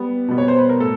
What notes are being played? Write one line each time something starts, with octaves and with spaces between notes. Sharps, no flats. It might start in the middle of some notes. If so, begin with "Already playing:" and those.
Already playing: G3 B3
B2 G3 B3
C#5
C5
B4
A#4
A2 A4